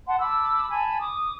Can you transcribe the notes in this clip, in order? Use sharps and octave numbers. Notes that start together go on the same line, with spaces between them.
F#5 A5 C6
A5 B5 D6 E6
G#5 A5 B5
D6 D#6